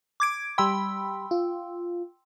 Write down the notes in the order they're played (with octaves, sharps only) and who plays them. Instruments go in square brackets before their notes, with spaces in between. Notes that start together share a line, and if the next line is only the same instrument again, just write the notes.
[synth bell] D6 G#6 D7
[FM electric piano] G3 B5 [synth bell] G5 C6 E6
[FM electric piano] F4